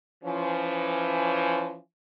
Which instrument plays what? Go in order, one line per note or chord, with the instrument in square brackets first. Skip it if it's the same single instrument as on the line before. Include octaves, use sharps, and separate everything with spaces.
[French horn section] E3 F3 C#4